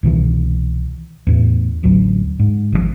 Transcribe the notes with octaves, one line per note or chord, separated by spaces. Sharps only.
C2 B2 D#3 E3
E2 A2
D1 A1 D2 F#3
G#2
G#1 C#3 F3